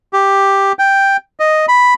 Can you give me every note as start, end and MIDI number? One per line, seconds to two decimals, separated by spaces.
0.13 0.72 67
0.79 1.17 79
1.40 1.66 75
1.68 1.94 83